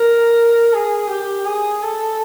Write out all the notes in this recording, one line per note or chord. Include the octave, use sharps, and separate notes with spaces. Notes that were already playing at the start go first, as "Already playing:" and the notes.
Already playing: A#4
G#4
G4
G#4
A4